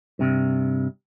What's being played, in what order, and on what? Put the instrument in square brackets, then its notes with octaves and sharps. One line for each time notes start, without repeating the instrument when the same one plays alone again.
[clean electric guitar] G2 C3